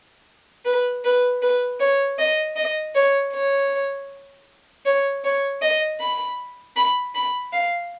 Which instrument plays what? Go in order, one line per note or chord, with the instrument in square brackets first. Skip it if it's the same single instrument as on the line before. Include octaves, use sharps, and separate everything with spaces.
[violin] B4
B4
B4
C#5
D#5
D#5
C#5
C#5
C#5
C#5
D#5
B5
B5
B5
F5